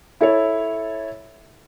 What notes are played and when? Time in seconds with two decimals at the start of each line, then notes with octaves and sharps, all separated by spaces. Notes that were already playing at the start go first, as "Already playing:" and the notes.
0.21 E4 A4 C#5